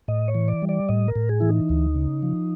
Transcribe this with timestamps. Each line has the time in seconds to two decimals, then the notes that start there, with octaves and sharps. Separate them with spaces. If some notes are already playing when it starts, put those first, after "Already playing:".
0.08 A2 D#5
0.28 C#5
0.35 E3
0.48 D5
0.62 G3
0.69 D5
0.89 A2 D#5
1.08 A#4
1.16 A2
1.29 G#4
1.40 E3 E4
1.49 D#4
1.69 D2
1.95 C#3
2.23 F3